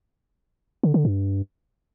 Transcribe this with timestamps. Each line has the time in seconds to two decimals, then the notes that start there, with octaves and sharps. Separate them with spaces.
0.83 D3
0.94 D3
1.05 G2